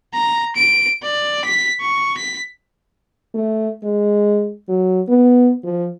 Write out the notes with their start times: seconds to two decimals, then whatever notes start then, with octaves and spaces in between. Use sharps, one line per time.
0.13 A#5
0.56 D7
1.03 D5
1.45 B6
1.81 C#6
2.18 B6
3.34 A3
3.84 G#3
4.69 F#3
5.08 B3
5.64 F3